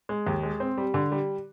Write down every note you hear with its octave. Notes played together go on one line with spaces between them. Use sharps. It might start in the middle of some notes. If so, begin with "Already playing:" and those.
G#3
D#2
G#3
C4
G3
D3
G3